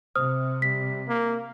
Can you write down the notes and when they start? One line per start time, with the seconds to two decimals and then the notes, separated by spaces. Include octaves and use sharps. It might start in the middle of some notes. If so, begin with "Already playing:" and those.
0.15 C3 C5 D#6 F6
0.62 G3 B6
1.07 A#3